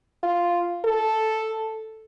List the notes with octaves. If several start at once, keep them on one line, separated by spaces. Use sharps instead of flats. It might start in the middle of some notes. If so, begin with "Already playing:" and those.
F4
A4